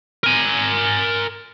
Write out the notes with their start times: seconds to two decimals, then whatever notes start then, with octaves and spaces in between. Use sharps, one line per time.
0.23 A#4 G#5